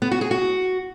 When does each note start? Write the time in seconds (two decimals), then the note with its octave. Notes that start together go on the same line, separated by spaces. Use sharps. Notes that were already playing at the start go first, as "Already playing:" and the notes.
0.02 B3
0.11 F#4
0.21 G#4
0.31 F#4